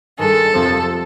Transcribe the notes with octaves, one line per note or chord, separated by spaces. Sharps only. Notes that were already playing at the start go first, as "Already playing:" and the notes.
G2 D#3 G#3 A4
F2 C3 F3